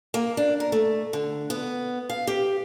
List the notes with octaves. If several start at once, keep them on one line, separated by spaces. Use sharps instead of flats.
A#3
D4
A#4
A3
D3
B3
F5
G4